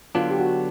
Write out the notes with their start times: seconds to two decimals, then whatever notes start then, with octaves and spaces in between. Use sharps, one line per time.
0.15 D3 F#3 B3 D4 F4
0.31 G4
0.40 F#4